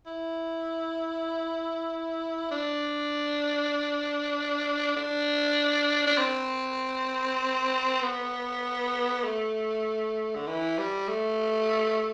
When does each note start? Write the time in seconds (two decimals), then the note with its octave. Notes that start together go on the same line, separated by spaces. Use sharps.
0.06 E4
2.51 D4
4.96 D4
6.07 D4
6.18 C4
8.02 B3
9.24 A3
10.36 D3
10.47 E3
10.78 G3
11.08 A3